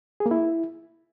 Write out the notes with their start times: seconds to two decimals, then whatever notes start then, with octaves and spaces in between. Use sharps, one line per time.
0.20 G#4
0.26 A#3
0.31 E4